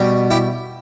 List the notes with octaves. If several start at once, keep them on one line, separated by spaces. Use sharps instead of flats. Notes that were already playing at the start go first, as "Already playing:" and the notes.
Already playing: B2 G3
E4 G4